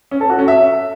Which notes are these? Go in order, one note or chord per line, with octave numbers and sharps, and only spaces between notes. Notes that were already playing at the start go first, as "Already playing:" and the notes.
C#4
A4
F#4
C#4
E5